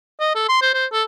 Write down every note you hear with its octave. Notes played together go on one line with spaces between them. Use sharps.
D#5
A4
C6
C5
C5
A4